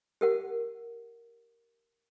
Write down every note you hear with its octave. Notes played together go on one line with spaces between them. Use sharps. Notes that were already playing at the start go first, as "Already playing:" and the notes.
G4 A#4 F#5